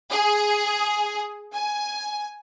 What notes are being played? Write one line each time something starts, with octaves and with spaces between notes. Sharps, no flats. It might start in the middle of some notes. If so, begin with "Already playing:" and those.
G#4
G#5